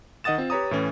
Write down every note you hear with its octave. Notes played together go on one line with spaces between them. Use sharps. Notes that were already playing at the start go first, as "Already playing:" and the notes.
D#3 D#5 F#5 D#6 A6 E7
C4 F4
G4 B4 C#5 A#5 D#6
A2 E3 C#4